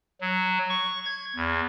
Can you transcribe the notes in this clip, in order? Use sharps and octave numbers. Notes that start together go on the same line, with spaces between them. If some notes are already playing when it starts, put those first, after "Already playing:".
F#3
C#6
G#6
E2